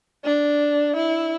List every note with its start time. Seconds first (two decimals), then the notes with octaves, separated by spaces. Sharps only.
0.24 D4
0.96 E4